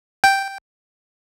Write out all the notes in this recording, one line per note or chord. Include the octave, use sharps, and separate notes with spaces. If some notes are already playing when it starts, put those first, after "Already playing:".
G5